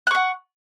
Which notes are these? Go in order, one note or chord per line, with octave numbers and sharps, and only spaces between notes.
F#5 C#6 F#6